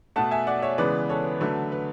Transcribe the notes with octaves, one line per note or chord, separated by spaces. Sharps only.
B2 A3 F#5 A5
E5 G#5
D5 F#5
C#5 E5
C#3 E3 G#3 B3 B4 D5
A4 C#5
D3 F#3 A3 B4
B4